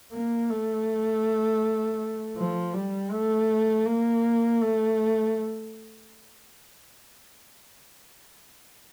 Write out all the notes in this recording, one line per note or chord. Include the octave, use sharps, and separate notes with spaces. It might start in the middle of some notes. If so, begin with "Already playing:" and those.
A#3
A3
F3
G3
A3
A#3
A3